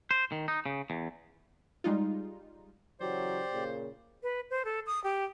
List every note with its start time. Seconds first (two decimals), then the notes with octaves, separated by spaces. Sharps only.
0.11 C5
0.32 D#3
0.48 D#4
0.66 C#3
0.90 E2
1.84 G3 G#3 D#4 F4
3.00 C#3 E3 F#3 G4 C5 D5
3.53 A#2 C#3
4.23 B4
4.50 C5
4.65 A4
4.86 D#6
5.04 G4